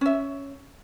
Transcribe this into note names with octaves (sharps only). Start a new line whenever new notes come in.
C#4 E5